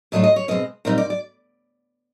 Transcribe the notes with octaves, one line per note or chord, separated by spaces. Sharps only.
A2 F#3 A3 D4 F4 D#5
D#5
C#5
B2 G#3 C4 D#5
A#2 G3 C4 D#4 D#5
D5
D5